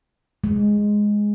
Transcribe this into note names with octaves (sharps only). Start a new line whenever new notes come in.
G#3